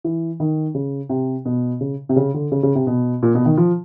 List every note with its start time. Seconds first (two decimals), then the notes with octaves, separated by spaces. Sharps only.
0.04 E3
0.40 D#3
0.75 C#3
1.09 C3
1.45 B2
1.81 C#3
2.09 C3
2.16 C#3
2.34 D3
2.52 C#3
2.63 C#3
2.75 C3
2.87 B2
3.23 A#2
3.35 B2
3.46 D#3
3.57 F3